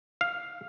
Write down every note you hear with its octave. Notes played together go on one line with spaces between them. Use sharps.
F5